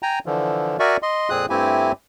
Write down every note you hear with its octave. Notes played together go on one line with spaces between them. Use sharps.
G5 G#5 A#5
D3 E3 F3
F#4 A#4 D5 E5 G#5 C#6
D#5 C6
F2 A#2 C4 G#4 D#6 F#6
G2 A3 C4 E4 G4 G#5